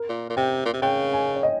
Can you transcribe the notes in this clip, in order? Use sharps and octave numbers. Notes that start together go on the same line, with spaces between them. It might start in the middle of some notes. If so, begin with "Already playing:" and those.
Already playing: A#4
A#2
A#2
C3 G5
A#2
C3
C#3 G5
G#5
C#5
D#5